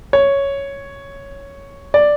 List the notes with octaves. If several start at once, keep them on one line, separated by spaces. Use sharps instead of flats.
C#5
D5